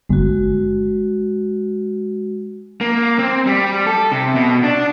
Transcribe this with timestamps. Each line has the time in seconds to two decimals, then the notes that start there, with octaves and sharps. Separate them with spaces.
0.09 G1 G#3 F#4
2.81 A#3
3.19 C4
3.47 G3
3.87 A4
4.12 C3
4.35 B2
4.63 D4